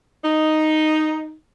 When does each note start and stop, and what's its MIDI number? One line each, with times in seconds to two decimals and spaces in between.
0.23 1.33 63